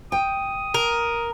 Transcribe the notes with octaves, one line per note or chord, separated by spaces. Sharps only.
G5 D#6
A#4